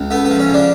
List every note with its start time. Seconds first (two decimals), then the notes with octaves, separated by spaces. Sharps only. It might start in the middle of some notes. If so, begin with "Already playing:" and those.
Already playing: C#2
0.11 A3 B3
0.25 F3 B3
0.39 C#4
0.49 C#3 D4